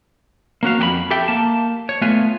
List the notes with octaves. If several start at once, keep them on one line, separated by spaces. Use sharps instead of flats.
A#3 C#4 F#4 F5
F2 G4 B5
G4 A4 E5 G5
A#3 A5
C#5
A3 B3 F4 B4 F5 G#5